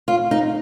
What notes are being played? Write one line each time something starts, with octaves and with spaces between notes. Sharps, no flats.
F4
D#4